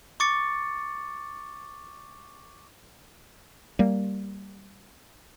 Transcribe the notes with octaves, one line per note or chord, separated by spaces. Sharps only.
C#6 D6 A6 C#7
G3 A#3